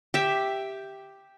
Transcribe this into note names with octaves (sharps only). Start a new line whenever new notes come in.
G4 E5